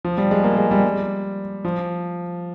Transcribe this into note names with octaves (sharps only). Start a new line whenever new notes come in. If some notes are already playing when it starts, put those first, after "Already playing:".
F3
G3
G#3
A#3
G#3
G3
G3
F3